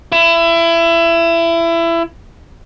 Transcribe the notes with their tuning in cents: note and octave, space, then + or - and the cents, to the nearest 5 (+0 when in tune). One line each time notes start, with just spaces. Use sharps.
E4 +25